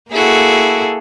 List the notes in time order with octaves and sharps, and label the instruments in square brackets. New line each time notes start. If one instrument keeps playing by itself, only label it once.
[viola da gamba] A#3 G#4 A4 [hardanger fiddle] E4 F#4